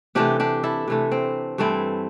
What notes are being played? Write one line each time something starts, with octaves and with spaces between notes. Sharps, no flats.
C3 E3 A3 D4 G4
D4 G4
E4 A4
C3 E3 A3
C4
G2 E3 A3 C4 E4